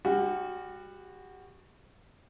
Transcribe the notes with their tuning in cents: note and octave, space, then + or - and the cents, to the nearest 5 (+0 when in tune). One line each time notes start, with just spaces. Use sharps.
G3 +30 F#4 +0